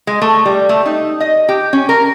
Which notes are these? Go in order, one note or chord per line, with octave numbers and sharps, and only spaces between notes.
G#3
A3
G3
A3
D#4
D#5
G4
C#4
A#4